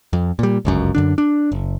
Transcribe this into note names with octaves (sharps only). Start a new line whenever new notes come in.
F2
A#2 G3
G1 C#2 F#2
F#2 D3 D4
D4
F#1